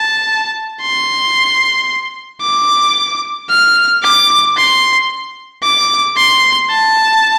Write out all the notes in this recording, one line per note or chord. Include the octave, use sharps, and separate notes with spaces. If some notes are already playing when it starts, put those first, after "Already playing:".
Already playing: A5
C6
D6
F6
D6
C6
D6
C6
A5